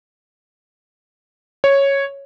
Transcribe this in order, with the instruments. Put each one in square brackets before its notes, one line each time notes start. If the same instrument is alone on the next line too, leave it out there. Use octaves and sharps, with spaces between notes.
[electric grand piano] C#5